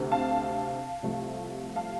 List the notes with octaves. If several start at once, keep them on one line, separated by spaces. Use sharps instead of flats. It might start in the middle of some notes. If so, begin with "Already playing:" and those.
Already playing: D2 C3 A3 C4
F5 A5
C2 C3 F3 A3
F5 A5